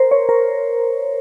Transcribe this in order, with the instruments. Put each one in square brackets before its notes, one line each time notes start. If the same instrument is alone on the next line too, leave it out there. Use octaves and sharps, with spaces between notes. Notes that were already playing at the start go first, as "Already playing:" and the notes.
Already playing: [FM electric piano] A#4 C5
C#5
A#4